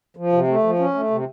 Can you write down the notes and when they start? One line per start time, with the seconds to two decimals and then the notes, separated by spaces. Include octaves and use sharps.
0.17 F3
0.32 C3
0.48 A3
0.63 F3
0.79 C#4
0.94 A3
1.10 C3